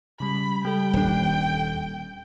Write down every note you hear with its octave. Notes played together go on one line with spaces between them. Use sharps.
C#3 G3 B5
G3 A4 G5
D#1 D4